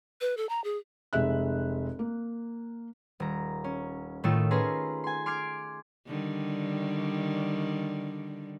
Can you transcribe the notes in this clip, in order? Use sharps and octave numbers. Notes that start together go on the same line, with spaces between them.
B4
A4
A#5
G#4
F1 G#3 E5 F#6
A#3
D#1 A#5
C#4
A2 D#3 A3 D#4 F4 E6
C#4 G#4 B4 A#5 C6
G#5 C6
C6 D6 F6 G#6 C7 D7
D3 D#3 G3